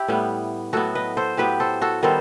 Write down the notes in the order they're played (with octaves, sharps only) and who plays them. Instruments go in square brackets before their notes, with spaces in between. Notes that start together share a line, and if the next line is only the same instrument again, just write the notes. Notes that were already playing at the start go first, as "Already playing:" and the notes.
Already playing: [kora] E4 G4
A2 G3 B3
A2 F#3 B3 F#4 A4
B4 D#5
A4 C5
A2 F#3 B3 G4 B4
A4 C5
F#4 A4
D#3 G3 B3 A4 C5